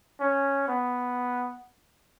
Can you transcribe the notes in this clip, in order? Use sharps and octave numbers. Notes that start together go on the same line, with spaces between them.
C#4
B3